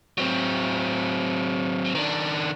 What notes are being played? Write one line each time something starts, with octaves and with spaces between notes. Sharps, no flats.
F#3 C4
D#3 D4